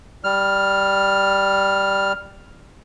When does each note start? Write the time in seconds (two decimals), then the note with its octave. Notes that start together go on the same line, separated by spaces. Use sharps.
0.24 G3 F6